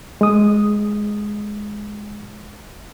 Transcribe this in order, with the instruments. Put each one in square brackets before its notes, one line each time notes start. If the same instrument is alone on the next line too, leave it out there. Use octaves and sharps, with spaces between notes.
[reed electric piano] G#3 D#6